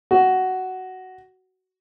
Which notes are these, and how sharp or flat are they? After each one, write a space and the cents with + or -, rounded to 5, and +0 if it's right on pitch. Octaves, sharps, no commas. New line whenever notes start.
F#4 +10